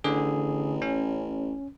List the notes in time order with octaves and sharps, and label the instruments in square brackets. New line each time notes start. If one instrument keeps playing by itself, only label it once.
[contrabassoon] A1 [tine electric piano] D3 G#4
[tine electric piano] C#4